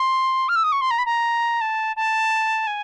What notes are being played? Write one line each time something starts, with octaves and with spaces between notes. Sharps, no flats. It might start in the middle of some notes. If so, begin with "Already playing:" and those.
Already playing: C6
F6
E6
D#6
C#6
C6
A#5
B5
A#5
A5
A5
G#5